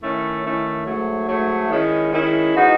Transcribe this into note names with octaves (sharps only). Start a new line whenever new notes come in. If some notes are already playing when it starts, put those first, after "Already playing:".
D#3 A3 C#4 E4
D#3 A3 C#4 E4
G#2 F#3 A3
G#2 F#3 A3
D#3 G#3 C#4 E4
D#3 G#3 C#4 E4
E3 G#3 D#4 F#4